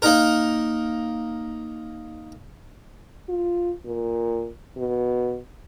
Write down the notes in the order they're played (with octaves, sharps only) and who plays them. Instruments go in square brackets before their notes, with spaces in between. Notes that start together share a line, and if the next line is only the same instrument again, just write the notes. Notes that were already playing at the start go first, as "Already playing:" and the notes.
[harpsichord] A#3 D#4 A#4
[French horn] F4
A#2
B2